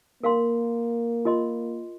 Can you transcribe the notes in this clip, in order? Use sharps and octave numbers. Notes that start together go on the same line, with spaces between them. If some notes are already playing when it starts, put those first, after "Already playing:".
A#3 A#4 F5 C6
F4 A#4 D#5 C6